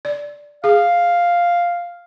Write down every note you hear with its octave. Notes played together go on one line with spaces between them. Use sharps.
D5
G#4 F5